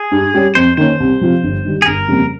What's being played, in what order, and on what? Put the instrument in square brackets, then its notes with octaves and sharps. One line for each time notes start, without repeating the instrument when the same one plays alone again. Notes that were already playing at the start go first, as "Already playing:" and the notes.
Already playing: [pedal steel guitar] G#4
[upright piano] G2
G3 C#4 G4
[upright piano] F2 [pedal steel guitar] C5
[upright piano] D#3 A#3 C#4 [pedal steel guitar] C5
[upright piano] C2
C3 F3 C4 F4
G1
G2 D#3 G3
[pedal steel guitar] G#4
[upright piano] G1 [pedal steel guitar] A#4
[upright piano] F2 C#3 G3 A#3